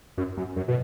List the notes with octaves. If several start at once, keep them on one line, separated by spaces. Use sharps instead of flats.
F#2
F#2
F#2
B2